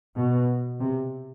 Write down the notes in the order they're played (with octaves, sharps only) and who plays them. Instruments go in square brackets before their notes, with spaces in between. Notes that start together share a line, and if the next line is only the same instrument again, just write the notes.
[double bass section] B2
C3